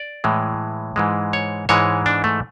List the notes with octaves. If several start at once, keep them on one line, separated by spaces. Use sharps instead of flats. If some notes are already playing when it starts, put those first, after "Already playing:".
Already playing: D5
A2 E3 G#3
G#2 E3 G#3
C#5
G#2 E3 G#3 C#5
D4
A3